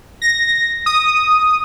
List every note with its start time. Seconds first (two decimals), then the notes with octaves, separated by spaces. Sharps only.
0.22 A#6
0.86 D#6